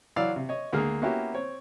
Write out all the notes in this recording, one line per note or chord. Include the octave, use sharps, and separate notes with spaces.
E3 F#3 D5 F5 E6
C3
C#5 D#5
D2 G#3 A#3 G#4 F6
A#3 B3 C#4 E4 F#4 G4
C4 C#5